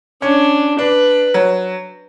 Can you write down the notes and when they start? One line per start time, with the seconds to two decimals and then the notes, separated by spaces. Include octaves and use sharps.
0.22 C#4 D4
0.79 D4 B4
1.34 F#3